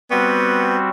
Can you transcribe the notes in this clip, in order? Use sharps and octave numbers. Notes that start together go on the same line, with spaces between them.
G3 B3 C4 F#4